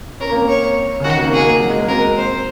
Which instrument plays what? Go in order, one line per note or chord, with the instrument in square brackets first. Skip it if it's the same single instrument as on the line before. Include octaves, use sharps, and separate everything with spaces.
[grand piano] C#4 [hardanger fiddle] A#4
[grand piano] A#3
C4
[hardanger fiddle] C#5
[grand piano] C#3
[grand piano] D#3 [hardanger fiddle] F#4
[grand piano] A#3
C4
[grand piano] A#3 [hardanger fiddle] G#4
[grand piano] F#3
G#3
A#3
[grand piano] C4 [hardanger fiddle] A#4
[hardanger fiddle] C5